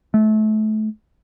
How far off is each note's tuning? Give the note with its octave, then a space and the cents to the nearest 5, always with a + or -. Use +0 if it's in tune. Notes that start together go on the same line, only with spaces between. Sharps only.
A3 -30